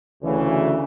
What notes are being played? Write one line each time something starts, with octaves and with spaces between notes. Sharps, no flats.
D2 C#3 E3